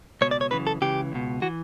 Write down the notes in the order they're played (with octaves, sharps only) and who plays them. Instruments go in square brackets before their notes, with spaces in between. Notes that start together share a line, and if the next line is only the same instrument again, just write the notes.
[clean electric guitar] C#2 B2 C#5
D5
C#5
F#2 C#3 E3 B4
A4
C#2 C#3 E3 G4
C#2 B2
E3 F#4